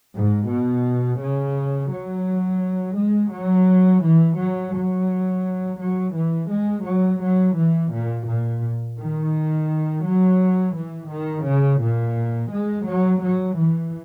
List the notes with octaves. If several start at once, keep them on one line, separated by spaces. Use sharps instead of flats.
G#2
B2
C#3
F#3
G#3
F#3
E3
F#3
F#3
F#3
E3
G#3
F#3
F#3
E3
A#2
A#2
D#3
F#3
E3
D#3
C#3
A#2
G#3
F#3
F#3
E3